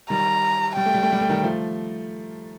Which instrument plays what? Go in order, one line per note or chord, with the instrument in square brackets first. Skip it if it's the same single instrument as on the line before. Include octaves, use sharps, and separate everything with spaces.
[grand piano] D#3 G3 [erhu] A#5
[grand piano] G3 [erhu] G5
[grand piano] A3
G3
A3
G3
A3
D#3 G3
F3 A3